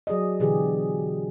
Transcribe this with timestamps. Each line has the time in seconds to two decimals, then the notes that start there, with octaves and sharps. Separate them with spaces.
0.07 F#3 G#4 D5 D#5
0.40 B2 D3 E3 G4 G#4